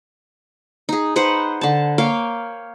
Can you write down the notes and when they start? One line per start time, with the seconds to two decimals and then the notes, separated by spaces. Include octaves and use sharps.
0.89 D#4 G#4
1.16 D#4 B4 C5 F#5
1.61 D3 A5
1.98 A#3 C#5 F5 G5